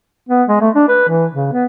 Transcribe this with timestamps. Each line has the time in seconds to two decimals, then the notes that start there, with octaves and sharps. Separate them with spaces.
0.29 B3
0.49 G#3
0.61 A3
0.75 D4
0.88 B4
1.08 E3
1.34 C#3
1.53 B3